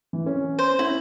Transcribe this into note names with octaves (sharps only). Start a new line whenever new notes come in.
E3
C#4
C5
C#4 E4